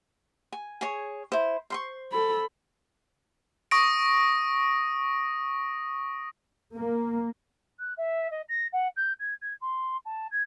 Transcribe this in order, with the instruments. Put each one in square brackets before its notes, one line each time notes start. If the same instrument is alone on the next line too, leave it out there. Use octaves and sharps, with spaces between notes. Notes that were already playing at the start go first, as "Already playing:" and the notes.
[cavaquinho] G#5
G#4 C#5
E4 C5
C5 C6 C#6
[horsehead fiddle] A4 B5
[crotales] C#6 D#6 A#6 D7
[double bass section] A#3
[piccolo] F#6
E5
D#5
A#6
F#5
G6
G#6
G#6
C6
A5
G#6